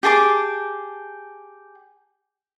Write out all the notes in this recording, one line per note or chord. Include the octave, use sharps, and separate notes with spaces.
G4 G#4 A5 D6